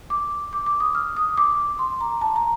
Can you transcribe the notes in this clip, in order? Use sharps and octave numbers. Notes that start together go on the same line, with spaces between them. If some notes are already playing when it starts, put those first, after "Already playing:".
D6
D6
D6
D#6
F6
D#6
D6
C6
A#5
A5
A#5